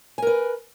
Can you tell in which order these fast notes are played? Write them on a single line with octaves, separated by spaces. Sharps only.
G#5 A#4 B4